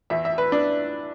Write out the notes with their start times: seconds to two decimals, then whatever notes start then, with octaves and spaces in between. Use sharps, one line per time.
0.10 E2 E3 E5
0.25 E5
0.38 B4
0.52 D4